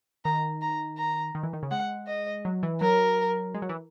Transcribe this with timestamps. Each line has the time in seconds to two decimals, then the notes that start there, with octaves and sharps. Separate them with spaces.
0.25 D#3 A#5
0.62 A#5
0.97 A#5
1.35 D#3
1.43 E3
1.53 D#3
1.63 C#3
1.71 G#3 F#5
2.07 D#5
2.45 F#3
2.63 E3
2.81 F#3 A#4
3.54 G#3
3.62 F#3
3.69 E3